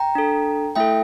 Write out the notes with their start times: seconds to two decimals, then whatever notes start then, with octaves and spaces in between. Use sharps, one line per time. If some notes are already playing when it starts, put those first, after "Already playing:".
Already playing: G5 A#5
0.15 D4 A4
0.75 A3 E4 A4 E5 G5